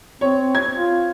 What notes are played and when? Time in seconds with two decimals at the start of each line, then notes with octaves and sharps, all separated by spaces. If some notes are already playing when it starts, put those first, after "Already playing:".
0.21 C4 C#5
0.55 G#6
0.75 F4